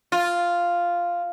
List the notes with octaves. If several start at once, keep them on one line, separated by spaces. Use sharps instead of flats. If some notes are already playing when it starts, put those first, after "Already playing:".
F4